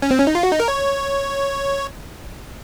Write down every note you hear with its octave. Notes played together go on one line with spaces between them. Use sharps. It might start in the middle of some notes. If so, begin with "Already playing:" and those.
C#4
C4
C#4
D#4
F4
F#4
D#4
A#4
C#5